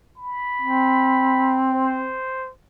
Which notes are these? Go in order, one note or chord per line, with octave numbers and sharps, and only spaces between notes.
B5
C4
C5